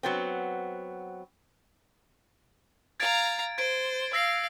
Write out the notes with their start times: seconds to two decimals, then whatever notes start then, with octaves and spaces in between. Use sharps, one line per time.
0.03 F#3 B3 C4
3.00 F5 A#5 G#6 A6 D7
3.58 C5 G#6 D7
4.13 F5 E6 A#6 C7